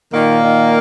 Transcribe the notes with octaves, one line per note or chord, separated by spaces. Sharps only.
A#2 D#3 A#3
D#3